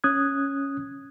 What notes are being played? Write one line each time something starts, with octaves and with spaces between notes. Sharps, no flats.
C#4 D#6 F#6 G#6